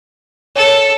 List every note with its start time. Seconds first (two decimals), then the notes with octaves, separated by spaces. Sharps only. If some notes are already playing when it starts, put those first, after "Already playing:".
0.56 A4 C#5